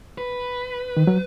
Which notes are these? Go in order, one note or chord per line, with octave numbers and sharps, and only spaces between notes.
B4
D#3
F#3